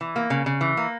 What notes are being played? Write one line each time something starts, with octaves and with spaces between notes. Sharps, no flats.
E3
A#3
C#3
C#3
E3
A#3